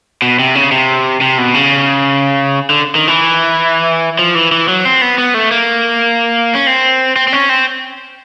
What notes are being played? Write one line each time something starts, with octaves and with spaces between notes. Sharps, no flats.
B2
C3
C#3
C3
C3
B2
C#3
D3
D#3
E3
F3
E3
E3
F#3
C4
B3
B3
A3
A#3
C#4
C4
C4
C4
C#4
C4